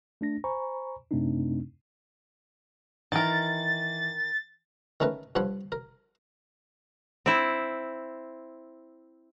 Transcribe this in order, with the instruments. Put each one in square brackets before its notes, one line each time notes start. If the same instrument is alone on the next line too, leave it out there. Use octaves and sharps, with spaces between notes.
[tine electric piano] A3 D4 A#6
C5 G#5 A#5 B5 C#6
F#2 C3 A3 C4 D4 D#4
[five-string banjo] D#3 A#4 [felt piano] E3 [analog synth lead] A6
[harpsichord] D#3 A3 C#4 A#4 B4
G2 F3 C#5 F#5 B5
A#4
[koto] C4 E4